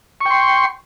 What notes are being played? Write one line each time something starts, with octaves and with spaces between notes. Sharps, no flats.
G5 C6 C#6